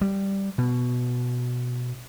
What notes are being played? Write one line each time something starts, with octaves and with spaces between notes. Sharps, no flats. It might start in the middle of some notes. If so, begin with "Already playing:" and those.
G3
B2